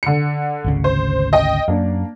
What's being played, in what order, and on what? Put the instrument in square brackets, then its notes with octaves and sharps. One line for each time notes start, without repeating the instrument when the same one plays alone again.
[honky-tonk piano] D3 C#7
[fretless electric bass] G#1 D2 C#3
[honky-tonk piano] C5
D#5 G5
[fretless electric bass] F#2 [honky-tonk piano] A#3 D4